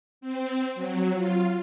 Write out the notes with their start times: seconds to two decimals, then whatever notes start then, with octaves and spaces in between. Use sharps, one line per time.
0.21 C4
0.75 F#3
1.14 F4